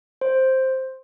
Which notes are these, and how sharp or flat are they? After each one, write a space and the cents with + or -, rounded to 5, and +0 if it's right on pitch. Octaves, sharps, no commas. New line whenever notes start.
C5 +5